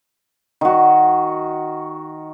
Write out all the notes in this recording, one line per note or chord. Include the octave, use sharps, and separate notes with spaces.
D#3 F#4